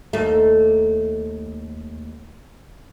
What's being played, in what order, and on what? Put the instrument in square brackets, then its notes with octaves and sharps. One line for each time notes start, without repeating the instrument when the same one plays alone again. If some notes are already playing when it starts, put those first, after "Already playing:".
[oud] D#2 A3